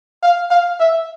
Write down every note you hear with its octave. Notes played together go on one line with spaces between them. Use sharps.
F5
F5
E5